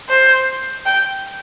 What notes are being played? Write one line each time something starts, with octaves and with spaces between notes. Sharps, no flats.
C5
G5